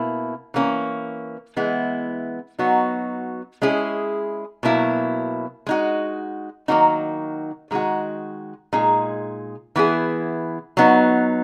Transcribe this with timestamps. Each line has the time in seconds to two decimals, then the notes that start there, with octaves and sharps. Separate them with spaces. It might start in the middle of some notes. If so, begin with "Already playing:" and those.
Already playing: B2 A#3 E4
0.54 E3 A#3 C#4
1.57 E3 G#3 B3 E4
2.59 F#3 B3 D#4 F#4
3.62 G#3 C#4 E4 G#4
4.63 B2 F#3 A#3 E4
5.66 G#3 D#4 F#4
6.68 D#3 F#3 A#3 D#4 F#4
7.71 D#3 G#3 D#4 F#4
8.73 A#2 G#3 D#4 G#4
9.76 E3 B3 E4 G#4
10.77 F#3 B3 D#4